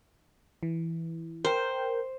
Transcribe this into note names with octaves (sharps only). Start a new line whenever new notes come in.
E3
A#4 C5 G5